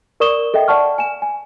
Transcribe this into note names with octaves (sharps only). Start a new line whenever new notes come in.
A#4 D5 C#6 D#6 E7 G7
A4 D#5 E5 G5
D5 F#5 A5 C#6 F6
G#5 E7
G#5